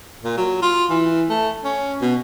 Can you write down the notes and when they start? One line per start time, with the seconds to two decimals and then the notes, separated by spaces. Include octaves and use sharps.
0.24 A#2
0.37 F#3
0.62 F4
0.90 E3
1.30 A3
1.64 C#4
2.01 B2